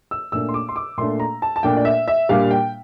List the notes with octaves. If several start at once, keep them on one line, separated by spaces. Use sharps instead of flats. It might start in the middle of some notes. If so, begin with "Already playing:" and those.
E6
A#2 A3 D4 E6
C6
D6
C6
D6
A#2 A3 D4 C6
A#5
A5
A5
A#2 A3 D4 G5
D5
E5
E5
A#2 G3 D4 F5
G5